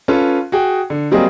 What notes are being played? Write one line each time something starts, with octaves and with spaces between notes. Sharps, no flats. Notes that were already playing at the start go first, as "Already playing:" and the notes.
C#4 F4 A4 B4
F#4 G#4 G5
D3
F#3 G3 A#3 C4 G#4 D#5